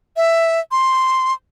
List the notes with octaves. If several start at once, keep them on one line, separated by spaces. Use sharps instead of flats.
E5
C6